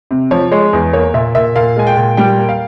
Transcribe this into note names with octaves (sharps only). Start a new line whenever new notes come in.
C3
F3 C#5
G#3 C#5
E2
A#3 C#5
A#2 E5
A#2 E5
A#2 F5
G#3 G#5
G5
A#2
G3 G5
A#3
F5